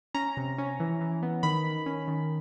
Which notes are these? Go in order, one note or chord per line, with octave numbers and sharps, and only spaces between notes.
C#4 A#5
C3
C#4
E3
E3
B3
D#3 B5
D#3
C#4
D#3